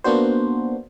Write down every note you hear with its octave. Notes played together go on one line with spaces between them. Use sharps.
A#3 B3 D4 F#4 C5